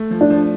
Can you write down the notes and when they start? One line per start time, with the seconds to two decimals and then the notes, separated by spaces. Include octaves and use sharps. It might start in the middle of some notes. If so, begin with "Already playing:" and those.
Already playing: A3
0.11 F3
0.21 D4
0.30 F3